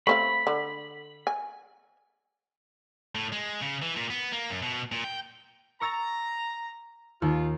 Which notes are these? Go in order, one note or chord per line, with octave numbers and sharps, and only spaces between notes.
A3 C4 F5 B5
D3
G#5
A2
G#3
C#3
E3
A#2
B3
A#3
F#2
B2
A#2
G5
A#5 C#6 E6 A6
D#2 F4